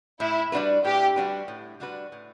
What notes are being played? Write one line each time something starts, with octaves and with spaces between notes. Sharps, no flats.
A2 E4
G3 D4 F#4 B4
A2 G4
G3 D4 F#4 B4
A2
G3 D4 F#4 B4
A2